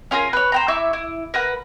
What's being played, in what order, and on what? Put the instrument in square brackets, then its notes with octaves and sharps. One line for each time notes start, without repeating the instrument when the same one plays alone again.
[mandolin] C#4 F4 G#4 A#4
B4 C#5
C5 G5 A#5
E4 E5 C#6 D6
E4
A#4 B4 F#5